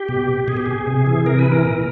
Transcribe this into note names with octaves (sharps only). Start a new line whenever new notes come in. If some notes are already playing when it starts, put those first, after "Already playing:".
Already playing: G4
B2
B2 G#4
G4
G#4
C3
E3
C3 A#4
B4
E3
A#4
A#2